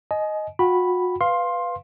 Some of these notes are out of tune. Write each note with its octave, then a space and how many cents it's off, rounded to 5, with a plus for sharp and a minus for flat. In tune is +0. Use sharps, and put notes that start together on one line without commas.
D#5 +0 G#5 +35
F#4 -40 G5 -45 B5 +0
B4 +0 F5 +0 C6 +15